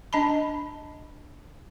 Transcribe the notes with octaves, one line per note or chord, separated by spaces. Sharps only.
D4 D#5 A5 B5